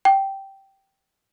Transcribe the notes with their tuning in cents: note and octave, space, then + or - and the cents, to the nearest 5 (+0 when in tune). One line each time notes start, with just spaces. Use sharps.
G5 -10